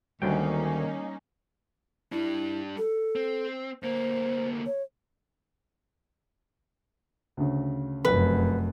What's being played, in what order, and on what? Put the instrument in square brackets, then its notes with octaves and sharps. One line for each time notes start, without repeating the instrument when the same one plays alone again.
[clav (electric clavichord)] D2 F#3 G5 [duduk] D#3 [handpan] G3 [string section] A#3 C#4 D#4
[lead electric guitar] G3 D4 [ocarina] E4
[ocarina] A4
[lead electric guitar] C4
[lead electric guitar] D2 A#3 [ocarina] C5
[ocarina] C#5
[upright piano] D2 C#3
[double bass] F1 F#2 [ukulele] B4